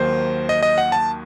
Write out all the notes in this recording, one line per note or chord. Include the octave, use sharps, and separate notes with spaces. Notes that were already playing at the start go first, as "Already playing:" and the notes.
Already playing: D#2 D#3 F#3 A#3 C5
D#5
D#5
F#5
A5